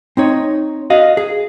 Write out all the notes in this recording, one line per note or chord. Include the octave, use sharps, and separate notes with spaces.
C4 D#4 C#5
F#4 D#5 F5
G#4